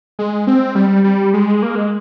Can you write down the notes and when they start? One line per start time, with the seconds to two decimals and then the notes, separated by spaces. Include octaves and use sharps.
0.19 G#3
0.47 C4
0.75 G3
1.04 G3
1.34 G#3
1.63 A#3
1.75 G#3